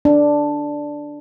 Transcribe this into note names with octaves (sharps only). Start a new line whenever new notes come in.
D4